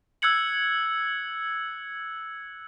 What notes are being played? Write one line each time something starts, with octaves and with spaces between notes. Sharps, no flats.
E6 F#6 G#6 C#7 F#7